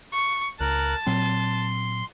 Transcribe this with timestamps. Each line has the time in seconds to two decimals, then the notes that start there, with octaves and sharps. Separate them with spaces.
0.13 C#6
0.60 C#2 A#4 A5 F#6
1.07 A#2 F#3 C4 C6